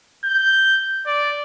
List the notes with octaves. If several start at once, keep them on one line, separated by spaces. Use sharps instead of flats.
G6
D5